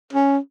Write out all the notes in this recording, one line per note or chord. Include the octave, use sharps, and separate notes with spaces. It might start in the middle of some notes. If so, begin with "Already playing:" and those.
C#4